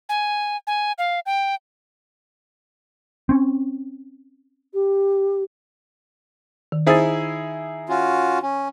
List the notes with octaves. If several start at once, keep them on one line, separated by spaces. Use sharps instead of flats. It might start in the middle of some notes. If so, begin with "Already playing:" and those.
G#5
G#5
F5
G5
C4 C#4
G4
D#3
D#4 E4 G#4 C5 A6
C#4 F4 F#4
C#4